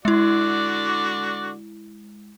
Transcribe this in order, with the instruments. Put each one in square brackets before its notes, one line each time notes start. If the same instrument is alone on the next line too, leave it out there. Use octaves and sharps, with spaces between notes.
[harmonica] D3 F#4 D5 [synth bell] G#3 E4